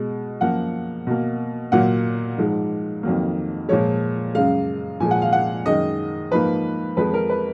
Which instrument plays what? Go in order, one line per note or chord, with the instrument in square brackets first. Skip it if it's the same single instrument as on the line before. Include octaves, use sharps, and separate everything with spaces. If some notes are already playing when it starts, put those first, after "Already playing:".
Already playing: [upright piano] B2 G#3
F#2 F3 A#3 F#5
B2 A#3
A#2 F#3 A#3 F#5
G#2 F3 G#3
F2 D#3 F#3 A#3
A#2 F3 G#3 C#5
F#2 C#3 G#3 F5
A#2 F3 G#3 G#5
F#5
F5
F#5
F#2 D#3 G#3 D#5
G#2 F3 A#3 B4
F2 F3 G#3 B4
A#4
B4